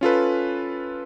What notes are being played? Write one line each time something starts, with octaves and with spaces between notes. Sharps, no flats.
C#4 F4 A4 B4